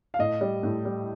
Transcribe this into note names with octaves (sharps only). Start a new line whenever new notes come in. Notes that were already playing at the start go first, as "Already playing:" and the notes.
F5
A2 D#5
G3
A2
G3